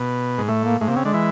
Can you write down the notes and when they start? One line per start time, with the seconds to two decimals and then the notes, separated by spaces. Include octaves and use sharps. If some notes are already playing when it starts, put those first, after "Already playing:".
Already playing: B2
0.38 G#2
0.48 A2 A3
0.65 A#3
0.81 G#2 A3
0.88 C3 A#3
0.96 C#3 C4
1.05 D3 G#3
1.13 E3